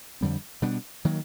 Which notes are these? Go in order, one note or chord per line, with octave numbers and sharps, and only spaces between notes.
F2 D3 G3 C4
B2 G3 B3 D4
D#3 F#3 A#3